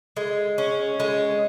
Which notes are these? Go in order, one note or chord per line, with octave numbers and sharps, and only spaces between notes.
G#3
C#4
G#3